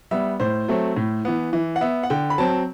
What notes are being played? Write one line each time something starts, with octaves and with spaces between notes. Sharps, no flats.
G3 B3 E5
A2 C5
F#3 A3 C4
A2
E3 B3
E3
F#5
B3 E5
F#5
D3 G5
B5
F#3 C4 A5